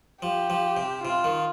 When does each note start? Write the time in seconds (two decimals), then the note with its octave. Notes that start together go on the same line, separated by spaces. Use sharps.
0.22 F3 G4
0.50 F3
0.77 C3
1.04 C3 F4
1.24 D#3